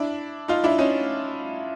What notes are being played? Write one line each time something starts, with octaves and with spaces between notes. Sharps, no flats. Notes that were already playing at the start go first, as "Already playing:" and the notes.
Already playing: D4 E4
D#4 F4
D4 E4
C#4 D#4